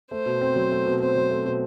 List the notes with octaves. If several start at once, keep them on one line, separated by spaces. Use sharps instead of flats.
A3 C5
B2
C4
F#3
A3
B2
C4 C5
F#3
A3
B2